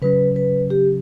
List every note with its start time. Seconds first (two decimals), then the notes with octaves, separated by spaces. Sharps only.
0.02 C#3 F#3 C#4 B4
0.36 B4
0.70 G4